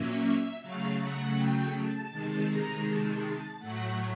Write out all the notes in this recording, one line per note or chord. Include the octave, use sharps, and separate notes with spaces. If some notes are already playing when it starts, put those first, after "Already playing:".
Already playing: A#2 F#3 A#3 C#4 E5
C#3 F#3 A3 F5
F#5
G5
A5
C3 D#3 G#3 A5
A#5
A5
A5
A2 F#3 A3 F#5